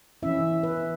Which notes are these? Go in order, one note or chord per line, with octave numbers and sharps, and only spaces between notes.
E3 C#4 E4 E5
B4